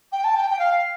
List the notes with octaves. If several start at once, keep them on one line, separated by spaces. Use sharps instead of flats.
G5
A5
G5
G5
F5